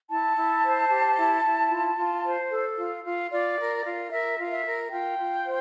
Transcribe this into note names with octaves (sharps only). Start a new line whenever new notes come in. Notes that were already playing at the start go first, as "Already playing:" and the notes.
E4 A5
E4
C5
G4
E4
E4
F4
F4
C5
A4
F4
F4
F4 D5
A#4
F4
A#4 E5
F4
E5
A#4
F4 G5
F4
C5